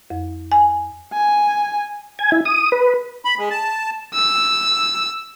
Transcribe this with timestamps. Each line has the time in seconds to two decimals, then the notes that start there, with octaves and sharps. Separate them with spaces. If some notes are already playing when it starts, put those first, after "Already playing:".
0.10 F2
0.52 G#5
1.13 G#5
2.19 G#5
2.32 E4
2.45 D#6
2.72 B4
3.25 B5
3.38 G#3
3.51 A5
4.15 E6